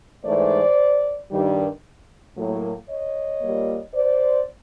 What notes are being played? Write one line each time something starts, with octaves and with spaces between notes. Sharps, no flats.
G#2 E3 A3 C5 D5
G2 D#3 G3
A2 F#3 A#3
C#5 D#5
A#2 G3 A#3
C5 D5